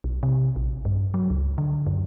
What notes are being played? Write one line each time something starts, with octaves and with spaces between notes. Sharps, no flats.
B1
C3
A#1
G2
F#3
C#2
D3
F#2